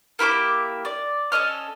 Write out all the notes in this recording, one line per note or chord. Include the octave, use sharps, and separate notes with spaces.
A#3 E4 G4 D6
D5
C#4 A4 D#5 F6